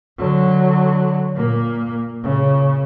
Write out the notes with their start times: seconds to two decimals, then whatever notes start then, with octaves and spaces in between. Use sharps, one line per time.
0.18 D3 F#3
1.36 A#2 A#3
2.23 A#2 C#3